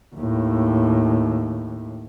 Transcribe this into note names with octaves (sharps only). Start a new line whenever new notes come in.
D#2 A2